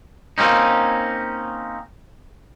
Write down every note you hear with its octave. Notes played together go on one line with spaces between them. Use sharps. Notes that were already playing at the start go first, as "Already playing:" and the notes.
A#3 C4 C#4 D#4